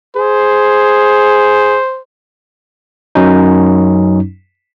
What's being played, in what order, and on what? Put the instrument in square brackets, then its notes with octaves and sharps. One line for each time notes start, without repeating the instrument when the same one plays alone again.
[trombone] G#4 [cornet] C5
[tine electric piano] F#2 F#3 C#4 D#4